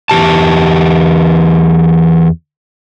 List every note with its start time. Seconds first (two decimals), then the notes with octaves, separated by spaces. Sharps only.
0.10 E2 C3 G4 A5